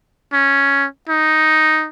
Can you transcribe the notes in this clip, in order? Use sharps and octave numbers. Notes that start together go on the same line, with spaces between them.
C#4
D#4